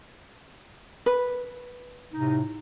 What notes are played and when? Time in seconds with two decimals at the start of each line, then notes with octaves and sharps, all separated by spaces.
1.06 B4
2.13 A2 C3 D#4